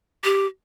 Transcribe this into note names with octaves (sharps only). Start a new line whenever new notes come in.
G4